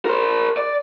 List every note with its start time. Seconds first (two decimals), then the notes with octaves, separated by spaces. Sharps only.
0.05 A#4 C5
0.57 D5